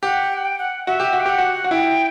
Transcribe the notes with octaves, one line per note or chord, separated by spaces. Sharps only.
G4 F#5
G5
F#5
G5
F#5
F#4 E5
G4
F#4
G5
G4 F#5
F#4
F#4
E4 G5